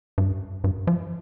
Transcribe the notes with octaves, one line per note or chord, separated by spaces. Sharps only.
G2
G2
F3